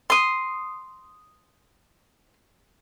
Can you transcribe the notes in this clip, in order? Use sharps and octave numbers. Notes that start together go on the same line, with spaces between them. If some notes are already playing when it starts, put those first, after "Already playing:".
C6 D#6